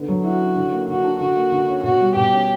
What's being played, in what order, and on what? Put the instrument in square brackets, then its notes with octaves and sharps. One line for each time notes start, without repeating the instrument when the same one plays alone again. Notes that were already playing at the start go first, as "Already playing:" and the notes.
Already playing: [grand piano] D3 B3
F#3
[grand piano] E4 [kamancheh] F#4
[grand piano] C#4
D3
A#3
[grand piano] D3 [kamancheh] F#4
[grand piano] D4
[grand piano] D3 [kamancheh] F#4
[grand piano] A#3
D3
C#4
[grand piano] B2 [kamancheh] F#4
[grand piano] G3
[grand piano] B2 [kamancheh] G4
[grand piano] C#4